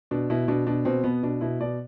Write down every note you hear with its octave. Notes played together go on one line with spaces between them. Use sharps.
B2 D4
B2 E4
B2 D4
B2 D4
B2 C4
B2 B3
B2 D4
B2 E4
B2 D5